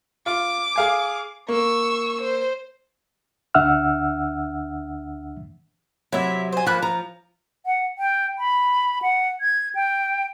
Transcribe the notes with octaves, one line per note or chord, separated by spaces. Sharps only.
F4 D6
G#4 F5 G#5
A#3 C#6 E6
C5
D2 D4 E5 F#5 E6 F6
C3 F#3 E4 E5
C5 G#5
F3 A#3 B5 F#6
F3 A#5
F#5
G5
B5
F#5
G#6
G5